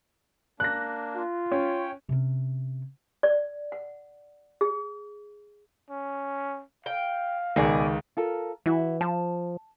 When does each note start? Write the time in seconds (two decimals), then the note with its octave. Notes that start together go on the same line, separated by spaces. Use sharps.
0.60 A#3 D4 F#6 A#6
1.16 F4
1.52 C#4 C#5 G5
2.09 C3 C#4
3.23 D5
3.72 F#5
4.61 G#4
5.90 C#4
6.86 F5 G5
7.56 C#2 B2 D#3 G#4 D5
8.17 F4 A4 A#4
8.66 E3 E4 F#4
9.01 F3 A5